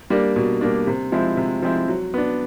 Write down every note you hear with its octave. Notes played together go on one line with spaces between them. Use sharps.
G3 A#3 D4
B2
G3 A#3 D4
C3
F3 G#3 C4 E4
C3
F3 G#3 C4 E4
F#3
B3 D4